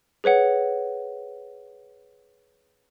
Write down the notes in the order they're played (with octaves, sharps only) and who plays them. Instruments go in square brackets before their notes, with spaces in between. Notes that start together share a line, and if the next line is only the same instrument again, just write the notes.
[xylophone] G#4 B4 C#5 F#5